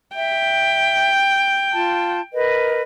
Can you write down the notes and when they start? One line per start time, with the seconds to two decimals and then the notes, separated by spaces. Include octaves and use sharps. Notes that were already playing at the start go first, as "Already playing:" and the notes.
0.15 E5 G5
1.73 F4 A5
2.33 A#4 B4 D#5